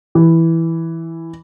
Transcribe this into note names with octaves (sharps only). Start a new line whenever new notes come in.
E3